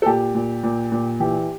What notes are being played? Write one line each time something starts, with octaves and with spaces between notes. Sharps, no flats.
A4
A#2 G4
A#2
A#2
A#2
E3 G4